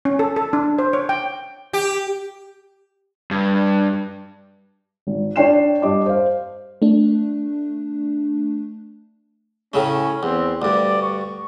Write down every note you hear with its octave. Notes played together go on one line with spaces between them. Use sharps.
C#4
A4
A4
D4
C5
C#5
G5
G4
G2
G#1
D4 C#5 D5 G5 C7 E7
G2 D4 D#5 D6
C5 F5
A3 D4
A2 C#3 A3 C#4
E2 C4
D2 G2 D5
C#6